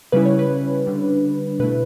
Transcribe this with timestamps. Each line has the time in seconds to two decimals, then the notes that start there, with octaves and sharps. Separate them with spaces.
0.12 C#3 G3 C#4 E4 B4
0.25 C#5
0.39 B4
0.86 D3 G3 D4
1.59 B2 A3 E4 B4